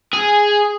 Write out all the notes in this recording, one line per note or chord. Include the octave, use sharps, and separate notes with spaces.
G#4